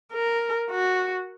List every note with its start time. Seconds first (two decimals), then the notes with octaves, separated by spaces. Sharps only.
0.13 A#4
0.71 F#4